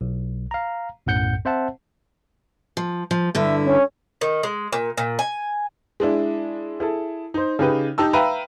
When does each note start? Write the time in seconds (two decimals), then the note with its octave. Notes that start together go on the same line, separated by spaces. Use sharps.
0.01 B1
0.51 F5 A#5
1.06 B1 F#2 A2 F#5 G6 C#7
1.45 C4 C5 E5 F#5 A5
2.77 F3
3.11 F3
3.35 G2 D3 E4 E5
3.65 C#4
4.21 D#3
4.43 G#3
4.73 A#2
4.97 A#2
5.19 G#5
6.00 G#3 D4 E4
6.80 E4 G#4 A4
7.34 D#4 C5
7.59 C#3 D#4 G4 B4
7.98 D#4 G4 A5 E6
8.13 B4 E5 F5 G5 A#5 B5